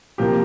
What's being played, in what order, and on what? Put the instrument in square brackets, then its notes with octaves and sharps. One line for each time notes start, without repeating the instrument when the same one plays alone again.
[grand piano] C3 F3 A#3 G4